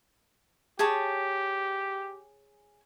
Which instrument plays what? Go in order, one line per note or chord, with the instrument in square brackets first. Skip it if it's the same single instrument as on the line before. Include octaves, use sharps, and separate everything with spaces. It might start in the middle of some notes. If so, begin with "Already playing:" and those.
[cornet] G4 [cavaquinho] G#4 C#5 A5